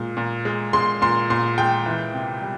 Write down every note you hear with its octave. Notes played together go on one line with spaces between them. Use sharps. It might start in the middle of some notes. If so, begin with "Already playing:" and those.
Already playing: A#2 G#3
A#2
G#3
G#3 C6
A#2 C6
A#2 C6
G#3 G5
E3
C3
G3